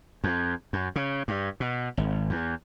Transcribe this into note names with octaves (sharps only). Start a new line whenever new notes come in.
F2
F#2
C#3
G2
B2
G#1
E2